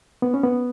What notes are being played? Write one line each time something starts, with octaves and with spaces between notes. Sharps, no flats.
B3
C#4
B3